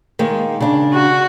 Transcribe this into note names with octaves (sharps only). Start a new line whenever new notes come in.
D#3 G#3 A#3
C#3 D4
F#4